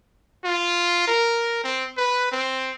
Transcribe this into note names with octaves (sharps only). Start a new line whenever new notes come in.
F4
A#4
C4
B4
C4